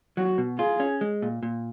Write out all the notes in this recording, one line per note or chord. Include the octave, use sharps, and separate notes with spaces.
F#3 F#4
B2
F4 G#4
C#4
G#3
A#2
A#2